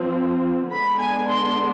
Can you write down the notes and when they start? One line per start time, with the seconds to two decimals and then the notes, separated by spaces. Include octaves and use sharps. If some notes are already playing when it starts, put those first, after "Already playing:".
Already playing: F3 C4
0.71 D3 G#3 B3 D4 B5
0.99 G#5
1.29 C6